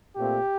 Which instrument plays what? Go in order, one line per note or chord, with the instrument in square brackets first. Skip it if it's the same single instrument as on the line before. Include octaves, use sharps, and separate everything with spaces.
[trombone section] A#2 A3 C4 G4